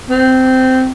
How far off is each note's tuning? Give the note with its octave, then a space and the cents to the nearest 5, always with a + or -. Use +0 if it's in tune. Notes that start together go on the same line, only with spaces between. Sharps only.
C4 -15